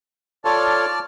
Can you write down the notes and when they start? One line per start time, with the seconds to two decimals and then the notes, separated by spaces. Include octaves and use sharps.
0.45 F4 A4 C#5 D5 A5 F6